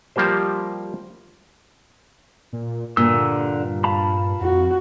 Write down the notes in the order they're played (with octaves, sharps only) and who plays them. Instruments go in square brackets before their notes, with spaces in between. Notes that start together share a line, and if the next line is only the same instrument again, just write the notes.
[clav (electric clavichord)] F3 G3 A#3 G4 C5
[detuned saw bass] A#2
[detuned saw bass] G2 [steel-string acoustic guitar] A#2 [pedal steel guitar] D3 E6
[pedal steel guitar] F5 A5 B5
[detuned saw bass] F2 [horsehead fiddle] F#4